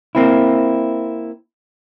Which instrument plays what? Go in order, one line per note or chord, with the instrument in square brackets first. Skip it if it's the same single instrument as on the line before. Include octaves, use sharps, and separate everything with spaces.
[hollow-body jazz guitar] A#3 C4 E4